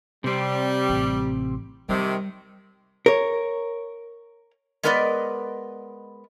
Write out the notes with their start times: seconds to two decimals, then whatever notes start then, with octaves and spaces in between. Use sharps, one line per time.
0.24 C3 G3 C4
0.89 A1
1.89 C3 D#3 G3
3.06 A#4 C#5
4.83 G#3 B3 A#4 B4 D5 D#5